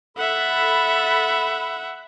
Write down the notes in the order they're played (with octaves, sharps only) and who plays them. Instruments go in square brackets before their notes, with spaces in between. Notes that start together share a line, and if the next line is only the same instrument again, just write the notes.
[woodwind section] A4 B5 [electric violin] E5 F#5